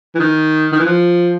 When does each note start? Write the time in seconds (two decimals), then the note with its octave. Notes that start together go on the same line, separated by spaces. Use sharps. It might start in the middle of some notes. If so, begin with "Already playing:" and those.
0.15 E3
0.20 D#3
0.72 D#3
0.79 E3
0.86 F3